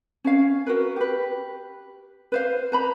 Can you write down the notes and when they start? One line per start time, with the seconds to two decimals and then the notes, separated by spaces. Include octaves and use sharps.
0.24 C#4 C#5 F5
0.66 F#4 A#4 B4
0.96 G4 B4
2.32 B4 C5 F5
2.72 B4 A#5 B5